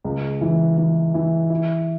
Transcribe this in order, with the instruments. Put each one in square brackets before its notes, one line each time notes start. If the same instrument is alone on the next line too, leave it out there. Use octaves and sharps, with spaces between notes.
[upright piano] C#2
E3
E3
E3
E4